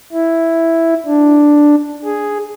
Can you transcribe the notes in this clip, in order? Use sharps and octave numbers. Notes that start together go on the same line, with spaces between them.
E4
D4
G#4